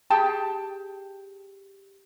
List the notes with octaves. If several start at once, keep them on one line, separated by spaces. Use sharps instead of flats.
G4 G#4 G5 A5